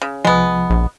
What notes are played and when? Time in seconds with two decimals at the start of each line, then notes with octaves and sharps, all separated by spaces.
0.02 C#3
0.25 C2 F3 G#3 B3
0.70 A#1